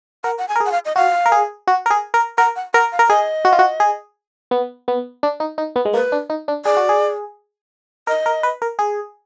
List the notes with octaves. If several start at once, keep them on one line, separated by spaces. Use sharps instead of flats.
A#4 F#5
F#5
G#5
A#4
G#4
F#5
F5
D#5
F#4 F5
A#4
G#4
F#4
A#4
G#4
A#4
A#4 F#5
F#5
A#4 F#5
F5
A#4
G#4 D#5
F#4
F4
F#4
G#4
B3
B3
D4
D#4
D#4
B3
G#3
A#3 B4
D4
D#4
D4
G#4 D5
F#4
G#4
A#4 D#5
A#4
B4
A#4
G#4